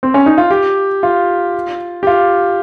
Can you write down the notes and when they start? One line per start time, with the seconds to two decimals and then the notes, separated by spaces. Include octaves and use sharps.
0.03 C4
0.14 C#4
0.26 D#4
0.38 F4
0.51 G4
1.03 F4
2.03 G4
2.07 F4